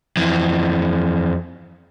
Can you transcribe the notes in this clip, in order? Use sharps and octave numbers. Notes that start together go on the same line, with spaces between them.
F2 E3